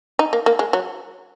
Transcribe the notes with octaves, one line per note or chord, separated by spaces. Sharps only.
D#4
A#3
A#3
G#3
F#3